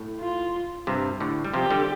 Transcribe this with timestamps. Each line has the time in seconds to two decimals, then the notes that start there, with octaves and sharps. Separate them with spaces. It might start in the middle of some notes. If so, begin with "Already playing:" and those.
Already playing: A2
0.20 F4
0.87 G2 C3
1.20 A2 D3
1.44 G3
1.53 C3 F3 G4
1.70 D3 G3